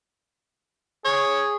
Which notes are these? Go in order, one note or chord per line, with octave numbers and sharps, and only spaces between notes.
G#4 C#5